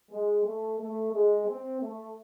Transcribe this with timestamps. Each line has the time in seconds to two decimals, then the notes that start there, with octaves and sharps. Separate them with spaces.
0.11 G#3
0.45 A3
0.79 A3
1.13 G#3
1.47 C4
1.81 A3